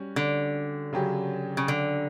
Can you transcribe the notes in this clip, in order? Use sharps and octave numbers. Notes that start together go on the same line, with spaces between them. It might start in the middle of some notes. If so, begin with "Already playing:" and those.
Already playing: G3 C#4 F#4
D3
C#3 F#3 C#4 G4
C#3
D3